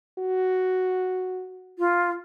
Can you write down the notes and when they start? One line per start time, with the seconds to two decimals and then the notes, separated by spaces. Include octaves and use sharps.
0.19 F#4
1.79 F4